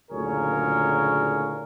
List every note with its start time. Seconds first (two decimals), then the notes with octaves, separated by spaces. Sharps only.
0.11 F#1 D2 A#2 G#4 A#4 C#5